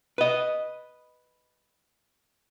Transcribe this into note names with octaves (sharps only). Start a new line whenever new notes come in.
B4 D#5